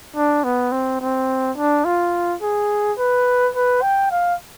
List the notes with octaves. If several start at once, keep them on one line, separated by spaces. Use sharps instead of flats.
D4
B3
C4
C4
D4
F4
G#4
B4
B4
G5
F5